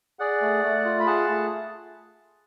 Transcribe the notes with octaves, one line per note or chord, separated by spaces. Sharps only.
G#4 D5 F#5
A3
A3
F4
B5
G#4 F#5 A5
A3